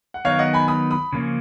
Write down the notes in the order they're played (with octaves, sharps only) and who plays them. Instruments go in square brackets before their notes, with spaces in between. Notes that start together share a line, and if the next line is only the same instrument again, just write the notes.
[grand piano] F#5
[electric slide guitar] D#3 F#3 B3 D#4 [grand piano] C#5 F5
[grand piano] D#5 F#5
G#5 B5
B5 D#6
B5 D#6
[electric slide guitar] C#3 F3 A#3 C#4